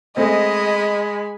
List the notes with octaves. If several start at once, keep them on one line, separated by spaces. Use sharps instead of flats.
G#3 A3 C4 D#5 G#5 B5